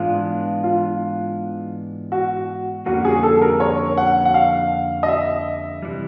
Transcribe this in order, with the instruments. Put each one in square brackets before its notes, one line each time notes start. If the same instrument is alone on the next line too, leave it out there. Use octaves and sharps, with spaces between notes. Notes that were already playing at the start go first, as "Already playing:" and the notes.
Already playing: [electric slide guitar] G#2 E3 G#3 B3 D4 [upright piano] F4
[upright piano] F4
F#4
[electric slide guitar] F2 D3 G3 A#3 C#4 [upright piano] F#4
[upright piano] G#4
A4
A#4
C#5
F#5
F#5
F5
D#5
E5
[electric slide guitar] C3 E3 G3